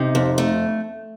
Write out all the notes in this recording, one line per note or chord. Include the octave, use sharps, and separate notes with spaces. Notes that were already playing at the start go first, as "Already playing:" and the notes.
Already playing: C3 D#4
F2
A3